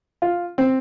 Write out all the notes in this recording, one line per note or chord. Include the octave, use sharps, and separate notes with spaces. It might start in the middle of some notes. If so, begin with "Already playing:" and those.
F4
C4